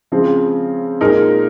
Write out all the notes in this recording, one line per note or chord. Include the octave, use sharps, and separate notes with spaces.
C#3 F3 G#3 C4
A#2 G#3 D#4 A#4